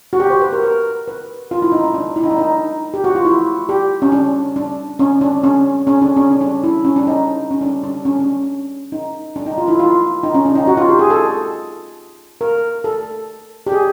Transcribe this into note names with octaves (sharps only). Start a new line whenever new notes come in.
F#4
G4
C5
B4
A#4
A#4
B4
F4
E4
D#4
D4
D4
E4
D#4
D4
D#4
G4
F#4
F4
E4
G4
C#4
D4
D4
C#4
D4
C#4
C#4
D4
C#4
D4
D4
E4
C#4
D4
D#4
C#4
D4
D4
C#4
D4
C#4
D#4
D4
D#4
F4
E4
F4
D#4
C#4
D4
D#4
F#4
F4
G4
G#4
A4
A#4
A4
G4
G#4